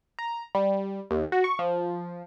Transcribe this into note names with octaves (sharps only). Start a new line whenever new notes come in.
A#5
G3
D#2
F#4
C#6
F3